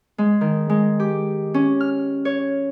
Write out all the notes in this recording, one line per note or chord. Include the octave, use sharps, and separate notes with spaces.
G#3
D#3
G#3
G4
C#4
F6
C#5